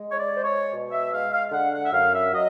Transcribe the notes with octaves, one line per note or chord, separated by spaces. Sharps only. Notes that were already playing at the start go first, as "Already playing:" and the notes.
Already playing: G#3
C#5
D5
G#3
C5
C#5
B2
E5
G#3 F5
F5
F5
D3 F#5
F#5
E5
F#2 F5
E5
F#3 D#5